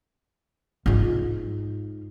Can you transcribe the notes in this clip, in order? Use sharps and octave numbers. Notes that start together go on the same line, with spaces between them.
G#2 F4